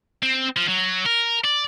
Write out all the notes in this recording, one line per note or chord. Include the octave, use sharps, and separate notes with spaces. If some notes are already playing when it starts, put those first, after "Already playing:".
C4
F3
F#3
A#4
D5